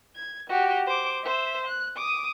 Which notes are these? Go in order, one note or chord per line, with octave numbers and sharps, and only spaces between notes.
G#6
F#4 G4
C5 D6
C5 E5
F#6
D6 D#6